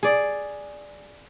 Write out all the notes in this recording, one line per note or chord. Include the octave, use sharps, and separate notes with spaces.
G#4 D5